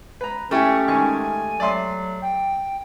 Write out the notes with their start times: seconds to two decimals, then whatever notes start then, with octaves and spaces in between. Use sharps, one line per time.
0.21 B4 A#5
0.51 A3 C#4 E4 G4 G#5 C#6
0.88 D#3 G#3 G#5 C#6
1.60 F#3 D5 E5 C6
2.21 G5